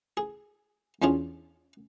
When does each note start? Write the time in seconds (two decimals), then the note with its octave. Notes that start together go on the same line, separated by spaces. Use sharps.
0.17 G#4
1.02 E2 C#4 D4 F4 G#4